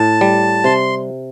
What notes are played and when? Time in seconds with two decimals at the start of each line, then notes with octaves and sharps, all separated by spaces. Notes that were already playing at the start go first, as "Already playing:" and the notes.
Already playing: A2 A5
0.21 G3
0.64 C3 C6